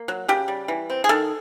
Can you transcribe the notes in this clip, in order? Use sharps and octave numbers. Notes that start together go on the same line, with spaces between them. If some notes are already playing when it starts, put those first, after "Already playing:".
Already playing: A#3
F#3
C#3 G4
G3
E3
C4
G#4
D#3 A4